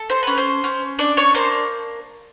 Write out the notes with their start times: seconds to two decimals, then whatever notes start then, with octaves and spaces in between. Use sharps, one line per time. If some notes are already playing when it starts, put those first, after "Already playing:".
Already playing: A4
0.10 C5
0.23 C#4 B4
0.38 C5
0.64 C#4
0.99 D4 D5
1.17 C#5
1.35 A#3 C5